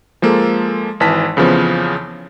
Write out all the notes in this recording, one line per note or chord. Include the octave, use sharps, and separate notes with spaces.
F3 G#3 A#3 A4
G#1 E3 A5 B6
F2 C#3 E3 F3 B3